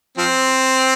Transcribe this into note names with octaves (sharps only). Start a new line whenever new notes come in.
F3 C4